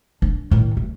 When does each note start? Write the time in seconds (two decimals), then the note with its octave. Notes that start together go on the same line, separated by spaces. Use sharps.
0.22 D4
0.51 A2 D#3
0.77 D2